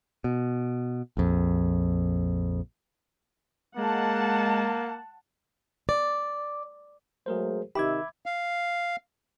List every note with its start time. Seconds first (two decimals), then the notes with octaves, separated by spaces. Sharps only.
0.24 B2
1.17 A#1 F2
3.77 G#3 A#3 F#5 A5
5.89 D5
7.26 F#3 G#3 A3 G#4 A#4 C5
7.75 C3 D#3 G4 E5 B5 D6 E6 G#6
8.26 F5